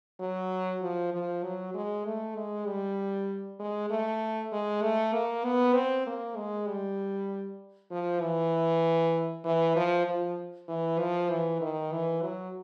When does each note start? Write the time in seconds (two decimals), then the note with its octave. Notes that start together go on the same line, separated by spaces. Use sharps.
0.20 F#3
0.82 F3
1.13 F3
1.43 F#3
1.75 G#3
2.05 A3
2.36 G#3
2.67 G3
3.60 G#3
3.90 A3
4.52 G#3
4.82 A3
5.13 A#3
5.45 B3
5.74 C4
6.06 A#3
6.36 G#3
6.68 G3
7.91 F3
8.21 E3
9.44 E3
9.76 F3
10.06 F3
10.68 E3
10.99 F3
11.30 E3
11.61 D#3
11.92 E3
12.22 F#3